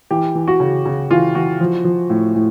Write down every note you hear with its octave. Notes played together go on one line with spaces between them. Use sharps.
E3 G4
E3
F#4
C#3
C#3
E3 F4
E3 F#4
F3
F3
A2
A2